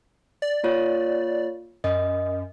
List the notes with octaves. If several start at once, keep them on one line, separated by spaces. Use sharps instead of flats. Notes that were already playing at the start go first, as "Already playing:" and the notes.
D5
A#3 F4 C#5
F#2 D#5